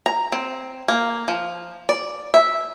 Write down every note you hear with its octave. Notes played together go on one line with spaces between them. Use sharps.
A#5
C4
A#3
F3
D5
E5